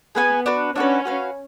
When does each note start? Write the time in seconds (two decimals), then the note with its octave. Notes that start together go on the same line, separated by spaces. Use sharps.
0.15 B3 G#4 B4 F5 G#5
0.46 D4 F#4 B4
0.75 C#4 D4 F#4 B4
1.05 F#4 B4 F5